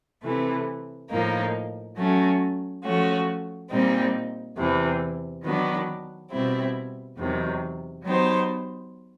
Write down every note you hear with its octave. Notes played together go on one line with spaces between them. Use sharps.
C3 E3 A3
A2 F3 A#3 D#4
F#3 A3 C#4
F3 A3 C#4 F#4
A#2 G3 C4 D#4
E2 C3 E3
D#3 F#3 B3 D4
B2 G3 C4 E4
E2 C3 D#3 F#3
F#3 B3 D#4 G4 C5